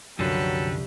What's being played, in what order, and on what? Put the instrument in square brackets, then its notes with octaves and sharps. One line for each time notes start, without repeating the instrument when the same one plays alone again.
[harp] C2 F3 [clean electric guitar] F#2 D3 [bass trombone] F#3 [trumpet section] A4 B4 G5